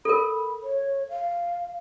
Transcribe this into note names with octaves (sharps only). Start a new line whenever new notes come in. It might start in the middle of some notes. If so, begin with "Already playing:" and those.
A4 A#4 B5
C#5
F5